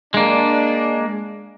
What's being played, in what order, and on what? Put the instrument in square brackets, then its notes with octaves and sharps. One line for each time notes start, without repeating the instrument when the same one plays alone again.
[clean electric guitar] G#3 A#3 [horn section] D4